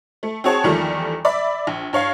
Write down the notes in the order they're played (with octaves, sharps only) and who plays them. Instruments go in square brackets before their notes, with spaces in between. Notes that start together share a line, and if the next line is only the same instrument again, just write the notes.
[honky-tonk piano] A3
C4 F#4 G#4 C#5 A5
E2 D#3 F3 G3 A3
D5 E5 B5 D6
A#1
G2 C#5 F5